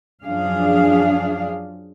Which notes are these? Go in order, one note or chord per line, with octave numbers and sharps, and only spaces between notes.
F#2 F3 D4 G#4 F5